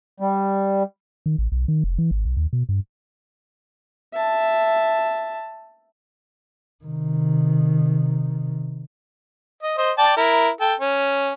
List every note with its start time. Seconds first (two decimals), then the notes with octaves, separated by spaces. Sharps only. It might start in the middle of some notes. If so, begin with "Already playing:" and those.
0.20 G3
1.26 D#3
1.38 A1
1.52 B1
1.68 D#3
1.84 F1
1.98 E3
2.11 G#1
2.25 B1
2.37 D#2
2.53 B2
2.69 G2
4.14 E5 A5
6.84 C3 D#3
9.63 D#5
9.78 C5 D#5
9.98 D5 G5 A5
10.17 E4 A#4
10.61 A4 G5
10.80 C#4